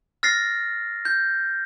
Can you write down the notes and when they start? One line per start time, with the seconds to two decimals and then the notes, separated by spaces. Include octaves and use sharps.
0.23 F6 A6 A#6 C7
1.05 G6